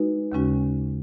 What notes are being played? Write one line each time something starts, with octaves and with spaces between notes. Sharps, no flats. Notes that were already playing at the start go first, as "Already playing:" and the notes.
Already playing: G#3 D#4 F#4 B4
D#2 C#3 G#3 C#4 F#4